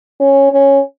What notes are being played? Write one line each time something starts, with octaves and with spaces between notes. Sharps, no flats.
C#4
C#4